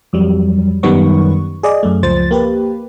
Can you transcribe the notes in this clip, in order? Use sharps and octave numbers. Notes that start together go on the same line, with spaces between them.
F2 F#3 G3
F#2 D#3 G3 B3 B4 C#6
G#4 D5 D#5
F#2 A3
C#2 F3 C5 A6
A#3 G4 B4